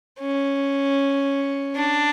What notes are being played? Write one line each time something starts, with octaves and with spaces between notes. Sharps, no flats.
C#4
D4